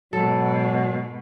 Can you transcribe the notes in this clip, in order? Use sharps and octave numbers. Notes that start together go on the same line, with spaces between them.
G#2 B2 F#3 A4